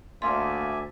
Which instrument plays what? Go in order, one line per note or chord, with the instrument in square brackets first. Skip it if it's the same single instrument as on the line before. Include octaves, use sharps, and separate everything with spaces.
[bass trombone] D2 [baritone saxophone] A#3 [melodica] D5 E5 G#5 [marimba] C6